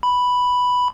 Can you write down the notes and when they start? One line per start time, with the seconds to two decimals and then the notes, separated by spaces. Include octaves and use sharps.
0.03 B5